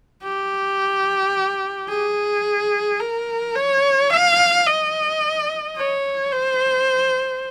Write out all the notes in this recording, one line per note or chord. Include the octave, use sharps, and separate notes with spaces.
G4
G#4
A#4
C#5
F5
D#5
C#5
C5